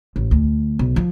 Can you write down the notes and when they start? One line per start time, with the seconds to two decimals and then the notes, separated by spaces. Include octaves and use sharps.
0.16 A1
0.31 D2
0.79 B1
0.96 F3